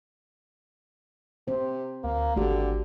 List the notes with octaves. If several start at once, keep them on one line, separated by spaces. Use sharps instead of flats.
C3 C4 C5
D2 A#3
G#1 D3 A3 F#4 G4